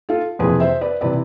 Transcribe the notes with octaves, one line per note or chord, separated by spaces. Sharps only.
F4 A4
F2 C3 E3 G#4 B4
C5 E5
B4 D5
C3 E3 B4 D5